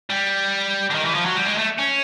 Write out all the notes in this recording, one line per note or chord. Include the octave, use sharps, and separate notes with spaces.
G3
D3
D#3
E3
F3
F#3
G3
G#3
A3
C#4